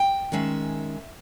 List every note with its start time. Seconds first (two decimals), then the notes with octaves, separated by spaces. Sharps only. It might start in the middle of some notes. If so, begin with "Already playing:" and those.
Already playing: G5
0.32 D#3 G#3 C#4 E5